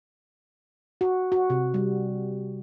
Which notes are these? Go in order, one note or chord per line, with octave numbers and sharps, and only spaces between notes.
F#4
F#4
C3
G3